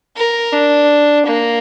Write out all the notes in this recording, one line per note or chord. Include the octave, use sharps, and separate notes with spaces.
A#4
D4
A#3